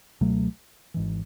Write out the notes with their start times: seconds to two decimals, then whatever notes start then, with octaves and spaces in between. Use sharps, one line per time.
0.21 C#2 B2 F#3 A3
0.94 G#1 G#2 E3